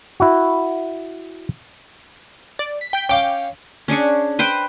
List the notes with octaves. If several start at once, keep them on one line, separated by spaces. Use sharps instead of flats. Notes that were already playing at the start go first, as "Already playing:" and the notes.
E4 F#4
D5
B6
G5 G6 B6
C#4 F5 G5 D6 G6
C#4 D4 G#4 C#6
B4 C5 G5